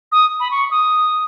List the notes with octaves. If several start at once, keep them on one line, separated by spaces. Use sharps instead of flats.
D#6
B5
C#6
D#6